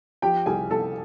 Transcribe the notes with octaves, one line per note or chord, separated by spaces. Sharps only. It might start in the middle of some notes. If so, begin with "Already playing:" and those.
F3 G4 G5
C2 G#4 G#5
C2 A4 A5